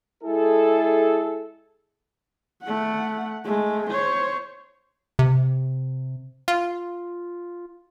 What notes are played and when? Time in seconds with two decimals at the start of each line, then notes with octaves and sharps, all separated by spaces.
0.23 G#3 E4 G#4 A4
2.63 A3 F#5
3.45 G#3 A3
3.90 C5 C#5
5.19 C3
6.48 F4